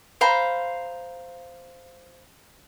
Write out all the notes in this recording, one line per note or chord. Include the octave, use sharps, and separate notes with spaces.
C5 F5 A#5 B5